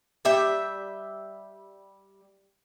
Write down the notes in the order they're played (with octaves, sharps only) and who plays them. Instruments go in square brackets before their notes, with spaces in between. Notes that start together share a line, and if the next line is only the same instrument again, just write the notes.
[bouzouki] G3 E5 G5